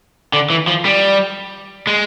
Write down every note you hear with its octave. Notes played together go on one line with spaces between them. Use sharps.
D3
E3
F3
G3
G#3